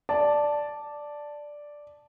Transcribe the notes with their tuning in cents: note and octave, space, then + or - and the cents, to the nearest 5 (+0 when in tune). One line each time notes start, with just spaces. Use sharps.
D5 +0 A5 +0